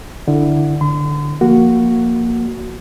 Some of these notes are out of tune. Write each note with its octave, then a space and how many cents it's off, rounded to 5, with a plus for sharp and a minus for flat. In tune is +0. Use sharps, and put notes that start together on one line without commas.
D3 +0 E4 +0
D3 +0 C6 -45
F3 +0 A#3 +0 F#4 +0